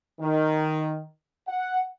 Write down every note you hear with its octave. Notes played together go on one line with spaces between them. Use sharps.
D#3
F#5